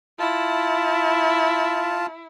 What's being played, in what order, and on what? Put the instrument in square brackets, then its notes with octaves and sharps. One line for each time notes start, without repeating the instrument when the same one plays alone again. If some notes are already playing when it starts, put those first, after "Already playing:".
[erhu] E4 [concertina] F4 A5